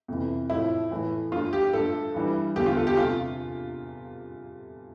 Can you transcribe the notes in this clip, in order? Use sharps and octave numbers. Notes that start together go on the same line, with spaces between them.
F2 C3 E3
A2 F3 A3 E4
A2 E3 A3
G2 F3 A3 F4
G4
G2 F3 A3 A4
G2 E3 G3
E2 D3 A3 G4
F4
A4
G4
C3 A3 F4